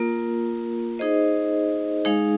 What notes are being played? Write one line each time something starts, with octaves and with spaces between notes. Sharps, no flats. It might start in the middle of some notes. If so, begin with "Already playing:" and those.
Already playing: A#3 F4 A#4
D#4 G#4 C5 D#5
G#3 D#4 G#4 F5